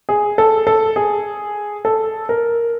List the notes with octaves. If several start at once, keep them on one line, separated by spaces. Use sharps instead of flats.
G#4
A4
A4
G#4
A4
A#4